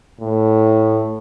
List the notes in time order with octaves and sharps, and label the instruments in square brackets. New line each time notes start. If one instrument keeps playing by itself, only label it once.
[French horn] A2